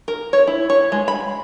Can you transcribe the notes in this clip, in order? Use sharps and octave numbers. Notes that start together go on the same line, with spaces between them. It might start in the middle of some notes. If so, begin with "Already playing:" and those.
A#4
C#5
E4
C#5
G#3
B5